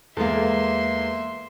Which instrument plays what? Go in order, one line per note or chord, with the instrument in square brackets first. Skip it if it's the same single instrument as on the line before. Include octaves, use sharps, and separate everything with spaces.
[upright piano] E2 A#3 [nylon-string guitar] G#3 B3 A4 [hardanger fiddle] E5 C6